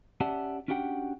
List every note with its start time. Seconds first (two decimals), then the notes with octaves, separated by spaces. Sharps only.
0.21 C#4 G4 D5 E5 F#5 A5
0.68 C#4 D4 F#4 G4 F#5 G5